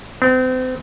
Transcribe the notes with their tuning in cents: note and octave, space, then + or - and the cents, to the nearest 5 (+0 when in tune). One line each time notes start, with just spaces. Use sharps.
C4 -35